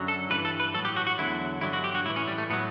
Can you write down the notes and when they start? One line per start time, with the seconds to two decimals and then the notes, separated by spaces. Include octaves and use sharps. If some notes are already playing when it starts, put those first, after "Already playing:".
Already playing: F#2 D3 F#3
0.08 A4
0.30 G2 E3 B4
0.45 A4
0.60 B4
0.74 A2 F#3 A4
0.85 G4
0.96 F#4
1.07 F#4
1.18 E2 D3 F#3 E4
1.61 G2 D3 F#3 E4
1.73 F#4
1.84 G4
1.95 F#4
2.05 A2 E4
2.10 E3
2.16 C#4
2.28 G3
2.38 A3
2.50 A2 F#3 B3